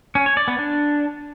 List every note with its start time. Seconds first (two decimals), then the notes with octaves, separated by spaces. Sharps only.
0.15 C#4
0.26 C#5
0.37 D5
0.48 B3
0.58 D4